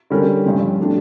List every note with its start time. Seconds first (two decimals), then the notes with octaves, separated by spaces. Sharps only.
0.10 D3 G3 C#4 G4 A#4
0.44 G2 F3 C#4
0.78 A2 F3 A3 D4 G4